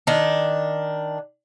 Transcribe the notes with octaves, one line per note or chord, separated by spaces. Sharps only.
D#3 D4